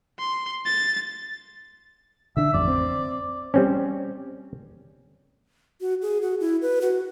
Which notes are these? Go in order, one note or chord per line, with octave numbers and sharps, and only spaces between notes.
C6
A6
D3 D4 E5
A1 F2 D5
C4
G3 C4 C#4
F#4
G#4
F#4
E4
B4
F#4